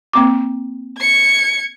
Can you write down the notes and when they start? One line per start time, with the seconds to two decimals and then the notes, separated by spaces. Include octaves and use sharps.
0.13 A#3 C4 D6
0.98 G#6 C#7